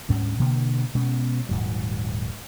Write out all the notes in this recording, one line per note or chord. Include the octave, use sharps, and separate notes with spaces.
D2 G#2 G3 C#4
B2 D3 A#3
B2 G#3 B3 C#4
D#1 G#2 F#3